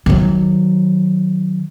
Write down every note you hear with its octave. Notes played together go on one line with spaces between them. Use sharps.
D#3 F#3